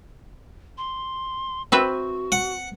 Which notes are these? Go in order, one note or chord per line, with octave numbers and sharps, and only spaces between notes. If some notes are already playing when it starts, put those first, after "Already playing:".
C6
C4 F#4 B4 E5
F#5